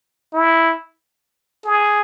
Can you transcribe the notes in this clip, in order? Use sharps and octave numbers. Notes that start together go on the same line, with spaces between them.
E4
G#4